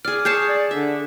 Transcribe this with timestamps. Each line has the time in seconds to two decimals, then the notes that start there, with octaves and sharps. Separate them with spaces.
0.05 G#4 D5 F6
0.25 G#4 C#5 A5 G6 C7 E7
0.49 D5
0.71 D3 E5